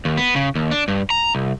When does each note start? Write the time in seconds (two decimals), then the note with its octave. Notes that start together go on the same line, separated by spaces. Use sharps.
0.05 D#2
0.18 B3
0.36 C#3
0.55 D#2
0.71 D4
0.88 G2
1.10 A#5
1.35 C2